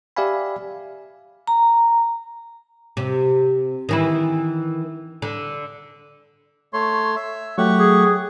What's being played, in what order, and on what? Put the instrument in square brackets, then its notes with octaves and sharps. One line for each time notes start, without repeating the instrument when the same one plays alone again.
[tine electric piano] G4 D5 E5 F5 G#5 B5
[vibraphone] A#5
[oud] C3
D#3 E3 E4
D3
[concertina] A3 C#5 C6
E5
[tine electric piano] F#3 A3 [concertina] G4 F#5 C#6
[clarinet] G#4